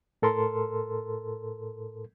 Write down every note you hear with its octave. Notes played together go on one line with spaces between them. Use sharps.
A2 A4 A#4 C6